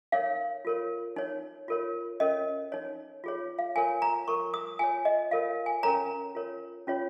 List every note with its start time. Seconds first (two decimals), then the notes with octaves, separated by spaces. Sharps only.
0.12 D#4 A#4 C#5 F5
0.65 F4 A#4 C#5
1.16 D#4 C#5
1.68 F4 A#4 C#5
2.20 C#4 A#4 C#5 D#5
2.72 D#4 C#5
3.24 F4 G#4 C#5
3.59 F5
3.76 F4 A#4 C#5 G#5
4.02 A#5
4.28 F4 A#4 C#5 C#6
4.54 D#6
4.79 F4 C#5 G#5
5.05 D#5
5.31 F4 A#4 C#5 F5
5.66 G#5
5.83 C#4 A#4 C#5 A#5
6.35 F4 A#4 C#5
6.87 C#4 F4 C#5